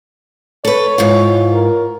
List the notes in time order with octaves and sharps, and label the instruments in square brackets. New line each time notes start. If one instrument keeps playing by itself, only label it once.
[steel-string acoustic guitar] A4 B4 [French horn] C#5
[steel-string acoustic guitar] G#2 E3 F4
[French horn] A#4